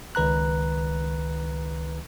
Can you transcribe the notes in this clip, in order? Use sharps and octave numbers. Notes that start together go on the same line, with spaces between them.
C#2 D#3 B4 A#5 F#6